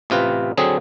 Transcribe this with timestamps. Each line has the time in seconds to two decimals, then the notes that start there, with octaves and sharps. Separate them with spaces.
0.10 A1 C3 F4 B4
0.57 D3 F#3 C4 G#4